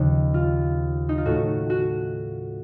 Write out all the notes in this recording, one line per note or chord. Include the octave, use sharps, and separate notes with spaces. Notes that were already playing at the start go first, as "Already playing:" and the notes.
Already playing: D#2 C#3 F3
F4
D#4
F4
A2 A3 F#4
F#4